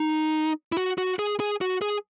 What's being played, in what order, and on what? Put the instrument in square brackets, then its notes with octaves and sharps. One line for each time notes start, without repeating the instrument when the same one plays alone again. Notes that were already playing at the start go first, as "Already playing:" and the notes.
Already playing: [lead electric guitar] D#4
E4
F#4
F#4
G#4
G#4
F#4
G#4